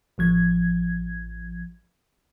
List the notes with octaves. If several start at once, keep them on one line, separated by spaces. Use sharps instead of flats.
A1 F3 G#6